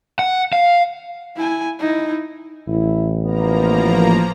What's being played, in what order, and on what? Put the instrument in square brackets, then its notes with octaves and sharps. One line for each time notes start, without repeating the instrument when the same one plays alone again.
[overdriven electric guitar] F#5
F5
[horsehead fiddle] E4 G#5
D#4 E4
[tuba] A1 [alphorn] E4
[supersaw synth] F3 A#3 A#5 [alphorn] B3